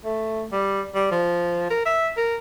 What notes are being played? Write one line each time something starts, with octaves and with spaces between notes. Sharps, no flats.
A3
G3
G3
F3
A#4
E5
A#4